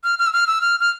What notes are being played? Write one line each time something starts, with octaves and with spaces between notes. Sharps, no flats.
F6
F6
E6
F6
E6
F6
F6